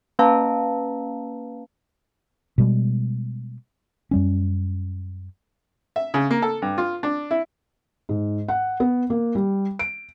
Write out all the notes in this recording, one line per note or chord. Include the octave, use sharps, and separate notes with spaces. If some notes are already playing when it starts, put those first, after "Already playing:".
A#3 C#4 B4 F5 A5 A#5
B2 G3 G#3
F#2 G3 C#4
E5
C#3
A#3
A4
G2
F4
D4
E4
G#2
F#5
B3
A#3
G3
D7